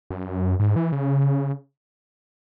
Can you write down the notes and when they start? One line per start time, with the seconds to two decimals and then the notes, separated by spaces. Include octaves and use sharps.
0.10 F#2
0.60 G#2
0.76 E3
0.92 C#3